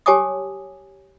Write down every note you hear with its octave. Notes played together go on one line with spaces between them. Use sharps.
G4 C#5 G#5 A5 D6 D#6